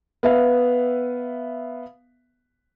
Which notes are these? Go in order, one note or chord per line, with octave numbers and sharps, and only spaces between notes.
B3 B4 E5 F5